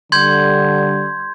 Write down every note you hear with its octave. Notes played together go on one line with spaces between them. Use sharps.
D3 G3 C6 G6 G#6